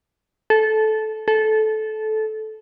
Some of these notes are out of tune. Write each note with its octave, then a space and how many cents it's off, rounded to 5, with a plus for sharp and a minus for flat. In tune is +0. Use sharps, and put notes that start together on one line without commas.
A4 -15
A4 -20